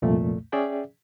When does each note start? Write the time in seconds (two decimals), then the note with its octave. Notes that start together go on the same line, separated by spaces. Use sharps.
0.02 C2 F2 A#2 A3
0.52 C#4 G#4 D5 E5 G5